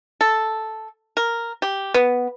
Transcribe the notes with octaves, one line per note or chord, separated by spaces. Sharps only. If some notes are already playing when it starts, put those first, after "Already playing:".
A4
A#4
G4
B3